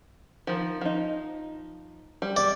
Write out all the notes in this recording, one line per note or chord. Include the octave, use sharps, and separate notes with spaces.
D#3 F3
F3 D#4
G3
D5